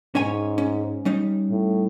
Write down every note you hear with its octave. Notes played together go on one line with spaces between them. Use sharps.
G#2 C#4 C#5 G#5
C#4
G3 C#4 D#4
A2